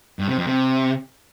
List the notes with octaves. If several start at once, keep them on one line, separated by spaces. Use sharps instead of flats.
G2
C3
F2
C3